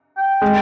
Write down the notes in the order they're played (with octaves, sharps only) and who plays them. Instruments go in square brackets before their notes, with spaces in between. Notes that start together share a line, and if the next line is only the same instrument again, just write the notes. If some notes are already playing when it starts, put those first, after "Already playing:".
[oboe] G5
[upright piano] G#3